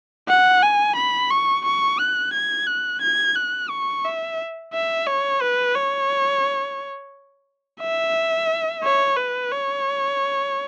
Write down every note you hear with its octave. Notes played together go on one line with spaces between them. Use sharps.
F#5
G#5
B5
C#6
C#6
F#6
G#6
F#6
G#6
F#6
C#6
E5
E5
C#5
B4
C#5
E5
C#5
B4
C#5